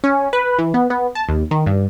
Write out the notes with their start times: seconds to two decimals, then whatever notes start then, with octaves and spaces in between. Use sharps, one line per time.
0.04 C#4
0.33 B4
0.58 E3
0.74 B3
0.90 B3
1.15 A5
1.29 D#2
1.51 D#3
1.66 G2